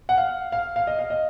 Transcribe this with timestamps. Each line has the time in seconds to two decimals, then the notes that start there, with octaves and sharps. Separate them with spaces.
0.09 F#5
0.17 F5
0.52 F5
0.76 F5
0.87 D#5
0.99 F5
1.10 D#5